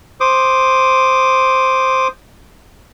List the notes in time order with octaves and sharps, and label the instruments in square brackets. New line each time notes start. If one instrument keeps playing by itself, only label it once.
[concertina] C5 D6 D#6